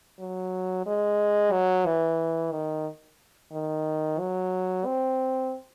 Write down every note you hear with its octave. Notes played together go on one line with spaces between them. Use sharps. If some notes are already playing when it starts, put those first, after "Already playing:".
F#3
G#3
F#3
E3
D#3
D#3
F#3
C4